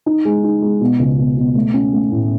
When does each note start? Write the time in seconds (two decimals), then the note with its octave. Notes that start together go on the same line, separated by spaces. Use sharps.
0.06 D#4
0.25 G#3
0.44 D#4
0.62 G#3
0.81 B2
0.99 C#2
1.18 B2
1.37 B2
1.55 A3
1.74 C#4
1.93 A3
2.12 A2